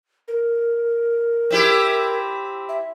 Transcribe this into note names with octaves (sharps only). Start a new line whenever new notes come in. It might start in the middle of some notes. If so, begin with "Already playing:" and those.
A#4
C4 E4 G4
E5